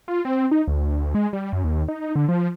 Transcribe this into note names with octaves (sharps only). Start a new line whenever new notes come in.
F4
C4
D#4
D2
G#3
G3
F#2
D#2
D#4
D3
F3